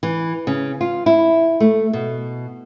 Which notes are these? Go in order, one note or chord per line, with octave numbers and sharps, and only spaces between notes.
E3
C#3
F4
E4
A3
B2